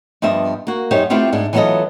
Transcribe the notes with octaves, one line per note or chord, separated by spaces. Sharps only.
G2 F3 B3 D#5 E5
A#3 F#4
F#2 D#4 G4 C5 C#5
A3 B3 C4 E4 F4 G4
G#2 G#3 D4
E3 F#3 B3 F4 A4 D#5